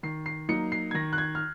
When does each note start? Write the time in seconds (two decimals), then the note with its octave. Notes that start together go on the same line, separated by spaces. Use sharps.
0.03 D#3 C7
0.26 C7
0.49 F#3 A#3 D#4 C#7
0.72 C7
0.91 G#6
0.94 D#3 A#6
1.13 F#6
1.18 G#6
1.35 F6